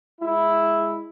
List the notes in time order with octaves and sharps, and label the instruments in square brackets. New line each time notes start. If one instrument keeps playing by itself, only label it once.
[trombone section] G#3 E4